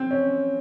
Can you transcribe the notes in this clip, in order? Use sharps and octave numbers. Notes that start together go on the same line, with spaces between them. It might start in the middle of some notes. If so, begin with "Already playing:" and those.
Already playing: C4
C#4